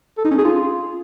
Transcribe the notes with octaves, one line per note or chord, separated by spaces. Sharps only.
A4
D#4
C#4
G#4
F4